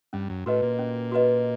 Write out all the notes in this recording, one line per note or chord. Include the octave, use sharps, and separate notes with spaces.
G2 C#4
F#2
A2 F#4 B4 D#5
A#2
C#4
F#4 B4 D#5